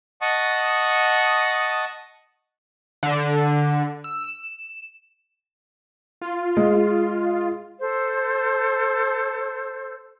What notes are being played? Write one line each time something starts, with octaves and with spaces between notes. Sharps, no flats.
D#5 F#5 A5 C#6 D#6
D3
E6
E7
F4
G#3
A4 C5